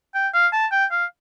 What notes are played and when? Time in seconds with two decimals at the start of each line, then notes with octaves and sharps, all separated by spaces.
0.15 G5
0.34 F5
0.53 A5
0.72 G5
0.91 F5